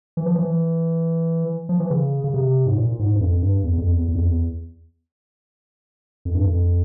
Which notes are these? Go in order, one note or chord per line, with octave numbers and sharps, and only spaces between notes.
E3
F3
E3
F3
E3
C#3
C#3
C3
G#2
A#2
G#2
G2
F2
G2
E2
F2
E2
E2
F2
E2
F2
G2
F2